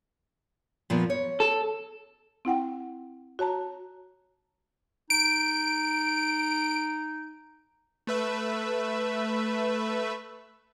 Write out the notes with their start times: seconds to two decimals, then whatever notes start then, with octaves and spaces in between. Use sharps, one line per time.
0.90 A#2 F3 B3
1.10 C#5
1.40 A4
2.45 C4 E4 F#5 G5
3.39 F#4 C#5 A5 A#5
5.10 D#4 D7
8.07 A3 B4 E5